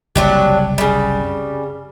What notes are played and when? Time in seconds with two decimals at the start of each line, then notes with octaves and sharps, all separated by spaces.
0.16 F#1 C2 F#3 D4 G4
0.78 C#3 G3